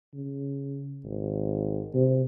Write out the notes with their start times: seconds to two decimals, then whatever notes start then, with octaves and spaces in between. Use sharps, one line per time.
0.14 C#3
1.05 G#1
1.94 C3